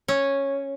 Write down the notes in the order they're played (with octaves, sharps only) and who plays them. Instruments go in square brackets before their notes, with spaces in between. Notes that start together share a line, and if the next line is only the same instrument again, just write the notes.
[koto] C#4